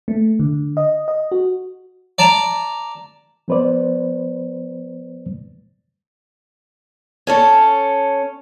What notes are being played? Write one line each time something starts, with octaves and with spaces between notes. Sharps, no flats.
A3
D3
D#5
D#5
F#4
D5 A5 A#5
F3 B3 B4 C5 D5
C#4 A4 C#5